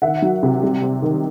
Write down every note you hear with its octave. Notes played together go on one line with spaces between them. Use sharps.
D#3 E5 F#5
F#3
C3
G3
C4
D#3